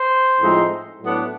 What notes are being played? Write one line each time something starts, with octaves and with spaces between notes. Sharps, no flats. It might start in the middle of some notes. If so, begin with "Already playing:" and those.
Already playing: C5
A2 F3 G#3 C4 D#4
A2 F#3 B3 D4